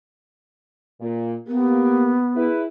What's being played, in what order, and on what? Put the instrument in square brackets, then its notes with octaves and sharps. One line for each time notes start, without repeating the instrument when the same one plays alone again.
[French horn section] A#2
[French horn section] A#3 G4 [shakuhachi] B3
[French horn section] E4 G#4 B4